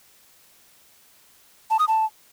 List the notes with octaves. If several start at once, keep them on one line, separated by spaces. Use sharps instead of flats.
A5
D#6
A5